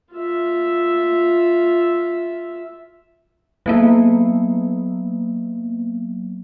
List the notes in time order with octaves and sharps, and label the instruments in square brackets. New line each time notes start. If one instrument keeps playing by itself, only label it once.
[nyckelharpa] F4 E5
[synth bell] F#3 A#3 B3